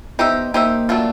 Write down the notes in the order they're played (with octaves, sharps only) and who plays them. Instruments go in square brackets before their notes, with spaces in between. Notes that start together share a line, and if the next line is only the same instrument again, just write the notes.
[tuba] B3 [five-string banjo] D#4 G4 C5 E5
[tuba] A#3 [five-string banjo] D#4 G4 C5 E5
[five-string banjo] F#3 A3 D4 F4